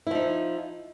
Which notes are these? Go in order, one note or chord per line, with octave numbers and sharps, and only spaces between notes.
F3 D#4 E4